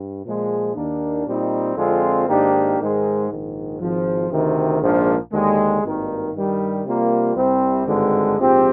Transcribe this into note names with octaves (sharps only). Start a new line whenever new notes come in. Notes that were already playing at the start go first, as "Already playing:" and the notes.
Already playing: G2
A#2 F3 G#3
D#2 D#3 A#3 D4
A#2 G3 C4 D#4
F2 D3 G#3 C4 F4
G#2 D#3 A#3 D4 G4
G#2 D#3 G#3
A#1 G#2 D#3
G#1 G#2 F3
D2 C3 D#3
A#1 G#2 F3 A#3 D4
D#2 D3 G#3
G#1 G2 D#3 A#3 D#4
G2 D#3 G3
C3 G3 A#3 F4
C2 C3 G3 C4
G#1 G2 D3 G#3
A#1 G#2 F3 C4 G4